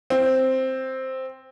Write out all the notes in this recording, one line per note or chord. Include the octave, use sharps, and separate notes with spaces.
C4